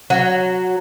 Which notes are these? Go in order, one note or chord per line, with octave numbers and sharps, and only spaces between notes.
F#3